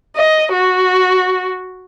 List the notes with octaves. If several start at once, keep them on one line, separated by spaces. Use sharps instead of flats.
D#5
F#4